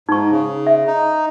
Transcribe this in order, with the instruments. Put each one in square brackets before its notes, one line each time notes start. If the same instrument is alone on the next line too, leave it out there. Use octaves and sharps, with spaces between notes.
[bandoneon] G#2 [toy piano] D#4 C#6
[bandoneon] C#3
[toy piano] E5
[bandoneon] D#4